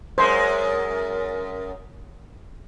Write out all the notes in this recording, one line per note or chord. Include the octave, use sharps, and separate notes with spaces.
F#2 G#3 A#4 C5